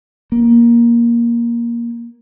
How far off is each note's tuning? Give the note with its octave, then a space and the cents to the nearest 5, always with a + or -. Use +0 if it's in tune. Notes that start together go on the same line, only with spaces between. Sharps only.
A#3 +15